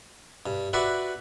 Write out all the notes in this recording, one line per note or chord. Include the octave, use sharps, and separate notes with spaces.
G2
F#4 B4 D5 E5 F#5